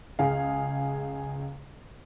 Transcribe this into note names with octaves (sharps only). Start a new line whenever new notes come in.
C#2 G#4 F5